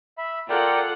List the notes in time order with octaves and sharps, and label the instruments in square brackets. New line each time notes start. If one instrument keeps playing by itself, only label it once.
[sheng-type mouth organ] E5 B5
[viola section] F4 A4 F#5 [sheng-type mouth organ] A#4 D5 G5